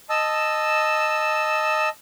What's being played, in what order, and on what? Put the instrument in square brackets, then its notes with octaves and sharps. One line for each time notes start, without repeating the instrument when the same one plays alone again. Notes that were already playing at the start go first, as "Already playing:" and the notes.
[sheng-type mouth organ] D#5 A5 E6